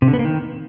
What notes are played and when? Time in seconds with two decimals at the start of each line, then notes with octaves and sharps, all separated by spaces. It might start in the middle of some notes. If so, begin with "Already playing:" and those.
0.02 C3
0.08 D3
0.13 B3
0.19 A#3
0.25 D#3